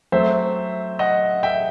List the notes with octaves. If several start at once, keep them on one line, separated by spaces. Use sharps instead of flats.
F#3 A3 C4 C5 E5
D#5 F#5
E5 G5